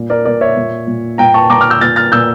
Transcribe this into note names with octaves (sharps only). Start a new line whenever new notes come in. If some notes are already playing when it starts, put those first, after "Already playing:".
Already playing: A#2
A#4 D5
A#2 A#4 D5
C#5 E5
A#2
A#2
A#2 G5 A#5
A5 C#6
A#2 A#5 D6
D6 F6
E6 G6
A#2 F6 A6
F6 A6
A#2 E6 G6